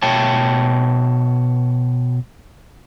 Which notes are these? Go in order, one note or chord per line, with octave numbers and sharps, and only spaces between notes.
B2 C#5 G5 A5